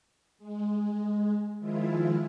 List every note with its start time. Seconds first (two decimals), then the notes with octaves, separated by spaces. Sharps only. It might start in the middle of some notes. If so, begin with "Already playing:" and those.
0.38 G#3
1.59 D#3 F3 G#3 E4 F4